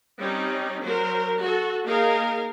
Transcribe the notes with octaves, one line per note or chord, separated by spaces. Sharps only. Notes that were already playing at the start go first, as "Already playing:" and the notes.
G3 C4 C#4 D#4
F#3 A#4 C5
F#4 A4
A#3 D#4 G#4 A#4 F5